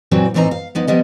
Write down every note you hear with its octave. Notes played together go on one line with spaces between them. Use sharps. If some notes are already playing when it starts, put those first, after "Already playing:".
A#2 E3 F#3 C4
A2 E3 C4 D#4 A#5
F5
F3 B3 D#4
F3 G3 B3 D#5